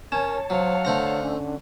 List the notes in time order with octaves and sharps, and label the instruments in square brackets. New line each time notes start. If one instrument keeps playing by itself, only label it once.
[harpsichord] C#4 [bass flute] A#4 [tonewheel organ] C#5 A5
[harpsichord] F#3 [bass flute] C5 [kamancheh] F5 F#5
[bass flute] D3 [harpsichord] A3 C5 A#5
[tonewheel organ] C#4